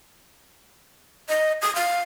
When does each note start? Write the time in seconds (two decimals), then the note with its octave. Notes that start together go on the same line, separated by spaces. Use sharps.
1.29 D#5
1.62 D#6
1.75 F5